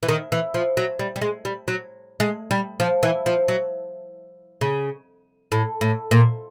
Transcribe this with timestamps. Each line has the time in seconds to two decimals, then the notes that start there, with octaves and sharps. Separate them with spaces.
0.03 E3
0.08 D#3
0.32 E3
0.54 F3
0.77 F#3
0.99 G3
1.16 G3
1.21 G#3
1.45 G3
1.68 F#3
2.20 G#3
2.51 G3
2.80 F3
3.03 E3
3.26 F3
3.48 F#3
4.61 C#3
5.52 A2
5.81 A2
6.11 A#2